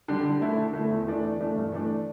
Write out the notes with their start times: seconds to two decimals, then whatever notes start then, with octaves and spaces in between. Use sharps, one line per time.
0.08 D3 G3
0.25 D3
0.41 A3 E4
0.57 D3
0.73 A3 E4
0.91 E2
1.07 E3 A3 D4
1.24 E2
1.40 E3 A3 D4
1.56 G2
1.72 E3 A3 D4